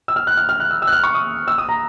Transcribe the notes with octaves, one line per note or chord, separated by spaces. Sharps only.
E6
F6
F#6
F6
F6
F#6
E6
E6
F#6
F6
C#6
D#6
E6
D#6
A#5